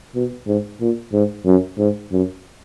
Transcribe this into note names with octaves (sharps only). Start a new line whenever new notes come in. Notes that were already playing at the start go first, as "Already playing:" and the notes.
B2
G#2
A#2
G#2
F#2
G#2
F#2